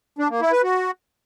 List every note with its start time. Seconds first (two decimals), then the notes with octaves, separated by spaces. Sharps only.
0.18 D4
0.30 A#3
0.41 E4
0.52 B4
0.63 F#4